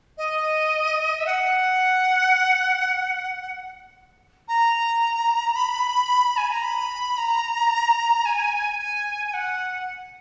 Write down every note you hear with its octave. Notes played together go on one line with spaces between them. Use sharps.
D#5
E5
F#5
A#5
B5
G#5
A#5
B5
A#5
G#5
G#5
G#5
F#5